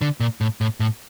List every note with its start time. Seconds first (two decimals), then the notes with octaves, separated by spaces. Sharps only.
0.02 D3
0.20 A#2
0.41 A2
0.61 A2
0.80 A2